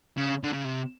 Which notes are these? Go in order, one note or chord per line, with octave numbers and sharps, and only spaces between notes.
C#3
D3
C#3
C3